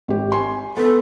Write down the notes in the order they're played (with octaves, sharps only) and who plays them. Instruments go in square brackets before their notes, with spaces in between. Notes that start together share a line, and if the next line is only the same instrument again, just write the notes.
[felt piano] G#1 G4
G#5 C6
[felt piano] B3 [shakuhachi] A4